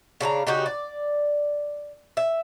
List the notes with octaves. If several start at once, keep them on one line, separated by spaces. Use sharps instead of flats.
C#3 D4 A4 A#5
C#3 D#4 F#4 G4
D5
E5